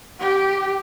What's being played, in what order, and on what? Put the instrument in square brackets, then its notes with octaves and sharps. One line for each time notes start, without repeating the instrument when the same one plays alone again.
[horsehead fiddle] G4